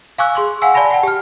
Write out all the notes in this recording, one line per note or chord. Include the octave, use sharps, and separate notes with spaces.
F5 G#5 C#6 D6 E6 F#6
G#4 C6 C#6
F5 F#5 G#5 E6
D5 G#5 A5 B5 A#6
F#5 G5 A5
G4 F6